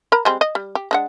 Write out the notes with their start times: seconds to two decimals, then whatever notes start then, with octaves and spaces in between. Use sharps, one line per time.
0.12 A#4 A#5 B5
0.25 G3 G#3 C4
0.41 D#5
0.55 G3
0.75 G4
0.91 G#3 D4 F#5